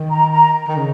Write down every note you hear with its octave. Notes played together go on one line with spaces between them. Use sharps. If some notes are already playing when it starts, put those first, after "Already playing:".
Already playing: D#3
A#5
A#5
D#3
C#3